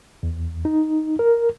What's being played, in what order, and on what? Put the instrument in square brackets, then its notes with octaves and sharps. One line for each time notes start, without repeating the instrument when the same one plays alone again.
[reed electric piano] E2
D#4
A#4